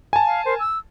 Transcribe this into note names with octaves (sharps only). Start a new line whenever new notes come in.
G#5 A5
F5
A#4 C5
E6